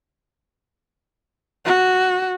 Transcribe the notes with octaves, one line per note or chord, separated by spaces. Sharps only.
F#4